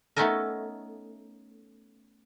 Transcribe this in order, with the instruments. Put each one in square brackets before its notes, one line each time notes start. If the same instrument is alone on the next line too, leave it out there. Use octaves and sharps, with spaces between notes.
[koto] A3 B3 C#4 D#4 A4 A#4